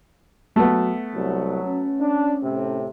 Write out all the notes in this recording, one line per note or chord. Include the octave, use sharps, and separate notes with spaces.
F#3 A3 B3
C2 F#3
C#4
D4
A2 C3